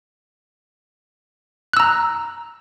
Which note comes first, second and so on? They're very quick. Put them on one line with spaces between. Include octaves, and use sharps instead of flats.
F#6 E6 A#5